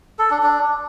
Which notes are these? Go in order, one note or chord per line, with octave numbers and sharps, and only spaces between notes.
A4
D4
D4